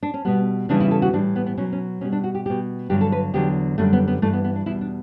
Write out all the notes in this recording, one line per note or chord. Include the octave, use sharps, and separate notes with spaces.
D4
C#4
B2 G3 B3
E2 C#3 E3 G3 D4
E4
A4
F#4
A2 E3 G3 D4
B3
B3
B2 F#3 C#4
C#4
B2 G3 C#4
D4
F#4
G4
B2 G3 G4
G2 D3 F#3 G4
A4
B4
E2 D3 F#3 G4
F#2 D3 G3 A3
B3
B3
G2 E3 G3 A3
B3
B3
D4
E2 B2 G3 E4
D4